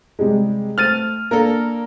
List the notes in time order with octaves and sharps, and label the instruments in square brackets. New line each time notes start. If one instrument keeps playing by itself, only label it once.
[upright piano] C3 G3 G#3
[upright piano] A3 C4 [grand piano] F6 A6 D#7
[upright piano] A#3 D4 [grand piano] A4 A#4